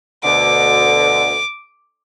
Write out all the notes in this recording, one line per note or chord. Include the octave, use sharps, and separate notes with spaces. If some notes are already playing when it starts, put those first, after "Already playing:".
D2 B2 D3 D6